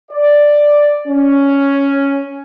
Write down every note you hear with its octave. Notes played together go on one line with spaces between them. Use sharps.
D5
C#4